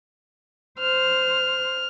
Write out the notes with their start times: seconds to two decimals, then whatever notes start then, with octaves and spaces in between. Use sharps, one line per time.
0.80 C5 F6